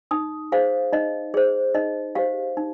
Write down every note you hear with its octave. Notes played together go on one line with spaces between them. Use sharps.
D#4 D#6
G#4 C5 F5
D#4 D#5
G#4 C5
D#4 D#5
G4 C5 F5
D#4